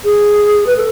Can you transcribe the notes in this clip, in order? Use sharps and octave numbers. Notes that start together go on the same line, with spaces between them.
G#4
B4
A4